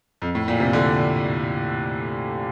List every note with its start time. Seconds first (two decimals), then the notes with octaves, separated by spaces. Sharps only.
0.22 F2
0.35 A2
0.48 A#2
0.60 C3
0.73 D3